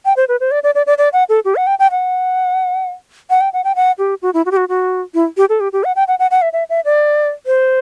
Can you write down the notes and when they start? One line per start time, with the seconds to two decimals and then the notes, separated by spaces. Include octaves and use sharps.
0.05 G5
0.17 C5
0.28 B4
0.40 C5
0.51 D5
0.63 D5
0.75 D5
0.87 D5
0.98 D5
1.13 F#5
1.29 A4
1.45 G4
1.56 F#5
1.67 G5
1.79 G5
1.91 F#5
3.30 F#5
3.41 G5
3.53 F#5
3.64 G5
3.76 F#5
3.98 G4
4.22 F#4
4.34 E4
4.46 F#4
4.51 G4
4.57 F#4
4.69 F#4
5.14 E4
5.37 G4
5.49 A4
5.60 G4
5.73 G4
5.84 F#5
5.96 G5
6.08 F#5
6.19 F#5
6.31 F#5
6.42 E5
6.53 E5
6.69 E5
6.85 D5
7.46 C5